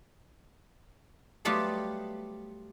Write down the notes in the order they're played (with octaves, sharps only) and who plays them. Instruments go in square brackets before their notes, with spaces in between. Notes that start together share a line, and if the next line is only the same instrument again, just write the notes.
[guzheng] F#3 G3 A3 B3 F4 G4